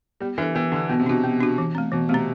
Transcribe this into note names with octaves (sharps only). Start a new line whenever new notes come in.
G3 B3
E3 D4 A4
E3 B3
D3 D4 A4
B2 B3
C3
B2 D4 F#4
B3
D4 F#4
E3
A3 C4
B2 E3
C3 A3
C4